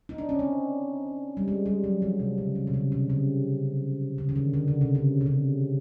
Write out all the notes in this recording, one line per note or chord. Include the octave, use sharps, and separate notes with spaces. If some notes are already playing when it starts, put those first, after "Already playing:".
D#4
D4
C#4
C4
G3
G#3
G3
F#3
F3
C3
C#3
D3
C3
C#3
C3
C#3
C#3
D#3
D3
D3
C#3
C3
C#3
C3
C#3